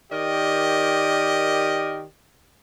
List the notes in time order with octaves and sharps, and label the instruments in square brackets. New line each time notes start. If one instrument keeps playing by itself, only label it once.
[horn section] D#3 G4 A#4 D5 D#5